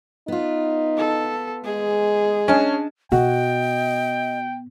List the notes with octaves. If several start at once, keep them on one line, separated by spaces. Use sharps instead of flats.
B3 D#4 F4
A4
G#3 G#4
C#4 D4 D#5 A5
B2 F#4 D#5 G5